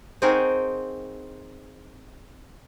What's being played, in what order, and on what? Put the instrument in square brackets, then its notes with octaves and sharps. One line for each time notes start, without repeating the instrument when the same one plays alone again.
[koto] C4 D#4 F#4 G#4 A#4